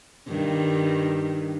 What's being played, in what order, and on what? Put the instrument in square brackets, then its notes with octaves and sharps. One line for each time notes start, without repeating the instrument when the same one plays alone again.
[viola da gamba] G2 D#3